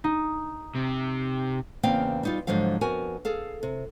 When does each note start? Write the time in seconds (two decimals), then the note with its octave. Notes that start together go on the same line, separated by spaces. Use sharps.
0.04 D#4
0.75 C3
1.83 E2 C#3 A#3 C4 F5 G5
2.23 G3 D#4 F4
2.47 G#2 D3 F3 F#3 F5
2.81 F2 B3 F#4 A#4 G#5
3.25 G#4 A4 F5
3.63 C3